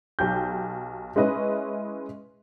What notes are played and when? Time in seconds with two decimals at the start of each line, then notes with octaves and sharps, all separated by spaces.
0.19 B1 G4 G6
1.16 G#3 C#4 E4 B4 D#5